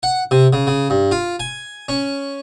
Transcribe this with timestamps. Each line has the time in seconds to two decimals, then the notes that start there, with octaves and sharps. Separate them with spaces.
0.03 F#5
0.31 C3
0.53 C#3
0.67 C#3
0.90 G2
1.11 F4
1.40 G#5
1.89 C#4